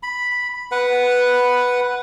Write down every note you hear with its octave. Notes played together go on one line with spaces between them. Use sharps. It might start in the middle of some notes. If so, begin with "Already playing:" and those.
B5
B4 F#5